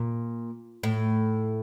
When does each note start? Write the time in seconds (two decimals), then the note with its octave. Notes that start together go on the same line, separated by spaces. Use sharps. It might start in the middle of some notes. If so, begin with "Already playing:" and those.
Already playing: A#2
0.83 A2